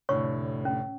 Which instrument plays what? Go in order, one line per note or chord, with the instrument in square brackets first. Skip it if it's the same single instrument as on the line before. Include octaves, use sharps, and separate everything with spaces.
[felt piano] F1 A2 D3 [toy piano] C#5 C#6
[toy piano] C#4